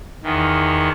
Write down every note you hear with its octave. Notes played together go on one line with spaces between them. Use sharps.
E2 D#3